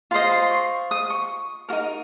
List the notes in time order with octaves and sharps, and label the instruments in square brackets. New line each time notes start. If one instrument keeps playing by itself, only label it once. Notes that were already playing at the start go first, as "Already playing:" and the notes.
[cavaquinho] F4 C5 D#5 C6
C6
C6
C#6
D#6
C#6
F#4 A#4
D#4